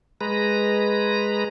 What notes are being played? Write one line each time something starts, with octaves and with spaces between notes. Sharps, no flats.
G#3 B4 A#5